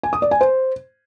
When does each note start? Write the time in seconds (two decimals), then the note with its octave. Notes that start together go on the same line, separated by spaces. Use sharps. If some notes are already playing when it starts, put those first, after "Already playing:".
0.03 G#5
0.13 D#6
0.22 D5
0.31 G#5
0.41 C5